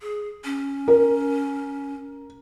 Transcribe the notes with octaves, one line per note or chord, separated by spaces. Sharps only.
G#4
C#4
A#4